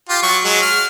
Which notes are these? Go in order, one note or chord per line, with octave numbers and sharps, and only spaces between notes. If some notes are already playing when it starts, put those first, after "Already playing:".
F4 G4
F#3 C#6
F#3 G#3
F6